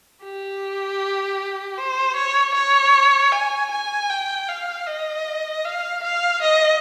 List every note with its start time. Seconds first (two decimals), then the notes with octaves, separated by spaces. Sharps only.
0.23 G4
1.78 C5
2.17 C#5
2.55 C#5
3.32 G#5
3.71 G#5
4.10 G5
4.49 F5
4.87 D#5
5.65 F5
6.04 F5
6.42 D#5